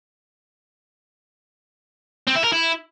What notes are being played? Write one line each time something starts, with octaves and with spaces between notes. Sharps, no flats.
C4
E4
A#4
E4